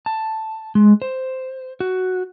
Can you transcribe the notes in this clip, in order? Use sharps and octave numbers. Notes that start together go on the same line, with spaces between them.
A5
G#3
C5
F#4